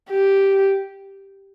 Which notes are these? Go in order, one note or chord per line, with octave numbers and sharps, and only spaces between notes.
G4